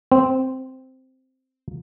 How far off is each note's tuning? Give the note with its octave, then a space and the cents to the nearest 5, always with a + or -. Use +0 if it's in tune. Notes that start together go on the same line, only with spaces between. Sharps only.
C4 -5